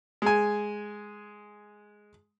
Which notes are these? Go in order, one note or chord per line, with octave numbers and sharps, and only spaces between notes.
G#3 G#5